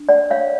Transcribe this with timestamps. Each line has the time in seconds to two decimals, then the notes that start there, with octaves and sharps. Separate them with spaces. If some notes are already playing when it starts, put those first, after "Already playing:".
Already playing: D4
0.09 D5 F#5
0.30 C#5 F5